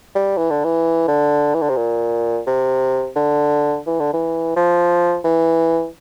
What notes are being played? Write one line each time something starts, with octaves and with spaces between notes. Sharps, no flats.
G3
E3
D3
E3
D3
E3
D3
C3
A#2
C3
D3
E3
D3
E3
F3
E3